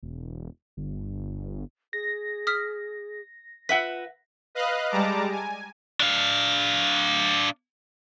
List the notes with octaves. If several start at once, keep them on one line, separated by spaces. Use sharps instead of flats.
E1
G1
G#4 A#6
D#6 F6 B6
F4 B4 E5 F#5 B6
B4 D#5 F5 F#6
G3 G#3 A5 A#5 D6
G#5
D4 F5